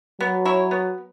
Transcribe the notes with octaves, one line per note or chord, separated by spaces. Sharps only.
F#3 B3
E4 C#5
B3